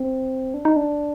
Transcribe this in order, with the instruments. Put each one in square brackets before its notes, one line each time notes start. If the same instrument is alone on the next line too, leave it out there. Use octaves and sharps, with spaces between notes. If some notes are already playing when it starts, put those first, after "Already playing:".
Already playing: [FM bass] C4
D4
D#4
D4